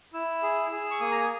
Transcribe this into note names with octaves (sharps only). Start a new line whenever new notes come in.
E4 E6
G#4
G#4
C#6
A#3 D#6
A#5
G#5